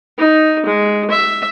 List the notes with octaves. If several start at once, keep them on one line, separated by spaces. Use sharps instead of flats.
D#4
G#3
E5